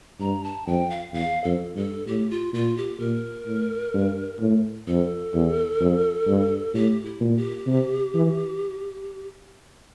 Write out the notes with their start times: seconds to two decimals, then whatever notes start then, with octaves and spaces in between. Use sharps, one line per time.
0.20 G2 A#5
0.44 A5
0.67 F2 G5
0.90 F5
1.13 E2 F5
1.44 F2 A4
1.76 G2 A4
2.07 A2 G4
2.30 F4
2.53 A#2 F4
2.77 G4
3.00 A#2 A#4
3.47 A2
3.94 G2
4.40 A2
4.88 F2 A4
5.34 E2
5.80 F2
6.27 G2
6.74 A2 G4
7.05 E4
7.20 A#2
7.37 G4
7.67 C3
8.14 E3